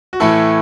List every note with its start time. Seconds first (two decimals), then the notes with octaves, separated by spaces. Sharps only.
0.13 F#4
0.20 A2 E3 A3 E4 A4